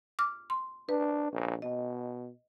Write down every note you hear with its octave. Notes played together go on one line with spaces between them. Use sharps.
D6 F6
C6
D4 B4
A#1
B2 D#5